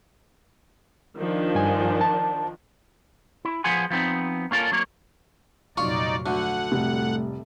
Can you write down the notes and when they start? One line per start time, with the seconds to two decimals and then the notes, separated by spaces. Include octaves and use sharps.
1.18 D#3 F3 D4
1.55 G2 G#5
2.01 A5
3.45 E4
3.64 F3 B3 G#4 F#5 G#5 C6
3.91 F3 B3 C4 D#4
4.51 A#3 C#4 F4 A4 A#4
4.72 F#3 A#3 C#5
5.77 F1 A#2 F#3 D#4 F4 D5 C#6
6.26 D2 D3 F#5
6.72 F1 A2 G3 A3